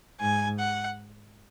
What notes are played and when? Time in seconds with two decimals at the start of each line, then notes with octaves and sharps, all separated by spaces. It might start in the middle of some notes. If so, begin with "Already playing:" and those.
0.21 G#2 G#5
0.59 F#5